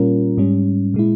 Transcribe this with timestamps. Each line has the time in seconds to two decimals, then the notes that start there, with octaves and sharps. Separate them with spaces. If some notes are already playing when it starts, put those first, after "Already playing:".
Already playing: A#2 G3 C#4 F4 A#4
0.38 G#2 G3 C#4
0.94 A#2 G#3 E4